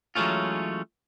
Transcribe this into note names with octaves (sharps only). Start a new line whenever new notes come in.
E3 F#3 G#3 A3 C#4 F4